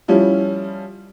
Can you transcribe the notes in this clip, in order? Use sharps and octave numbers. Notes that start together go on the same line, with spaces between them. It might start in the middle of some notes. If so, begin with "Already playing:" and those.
F3 G3 C#4 E4